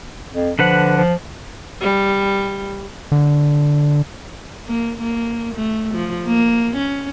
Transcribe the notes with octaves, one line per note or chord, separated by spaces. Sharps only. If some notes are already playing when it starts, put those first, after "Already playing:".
F2
D3 F3 B4 F#5
F3
G3
D3
A#3
A#3
A3
F3
A#3
C#4